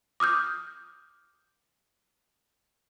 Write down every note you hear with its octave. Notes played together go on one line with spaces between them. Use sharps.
D6 D#6 F6 G6